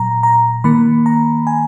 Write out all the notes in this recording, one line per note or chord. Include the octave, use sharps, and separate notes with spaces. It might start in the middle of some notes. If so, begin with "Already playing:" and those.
Already playing: A#2 F#3 A#5
A#5
D#3 A#3 B5
A#5
G#5